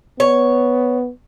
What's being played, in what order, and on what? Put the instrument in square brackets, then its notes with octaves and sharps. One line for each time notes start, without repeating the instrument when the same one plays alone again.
[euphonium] B3 [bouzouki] C#5